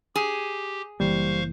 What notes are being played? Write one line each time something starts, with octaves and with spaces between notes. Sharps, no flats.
G4 G#4
F#1 E3 G3 A#3 C5 F5 C#6